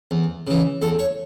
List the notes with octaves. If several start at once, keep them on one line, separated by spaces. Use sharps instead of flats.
E2
C#3 E3
E2 A4
C#5